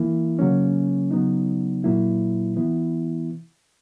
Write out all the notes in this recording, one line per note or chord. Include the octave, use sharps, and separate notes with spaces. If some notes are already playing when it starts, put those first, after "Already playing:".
Already playing: E3 A#3 E4
C#3 F#3 A#3 C#4
C#3 F#3 B3 D#4
A#2 F#3 A#3 E4
E3 B3 E4